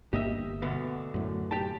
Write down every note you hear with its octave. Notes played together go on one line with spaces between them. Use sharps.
G1 G2 A#3 G4 D#5 E5
D2 B2 D3
F#2 A2
G4 G5 A5